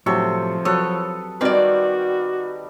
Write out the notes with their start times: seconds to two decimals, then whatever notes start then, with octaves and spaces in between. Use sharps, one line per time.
0.06 A2 C3 F3 F#3 G4 A4 C#6
0.65 F#3 A4 B4 C#5 D#6
1.41 D#3 G3 C4 F#4 B4 D5